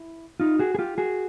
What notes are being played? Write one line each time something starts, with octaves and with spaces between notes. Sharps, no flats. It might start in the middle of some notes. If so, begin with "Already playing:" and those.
Already playing: E4
D#4 F4
F#4 G#4
G#4
F4 G4
F#4 G#4